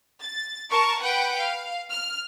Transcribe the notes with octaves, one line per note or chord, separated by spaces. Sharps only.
A6
A#4 A5 C#6
B4 F#5 G5
F5
F6